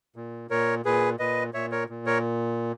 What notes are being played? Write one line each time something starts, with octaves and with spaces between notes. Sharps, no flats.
A#2
A#2 A#4 C#5
A#2 G#4 B4
A#2 B4 D#5
A#2 C#5 E5
A#4 C#5
A#2
A#4 C#5